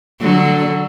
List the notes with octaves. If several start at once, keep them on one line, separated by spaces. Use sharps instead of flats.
D3 F#3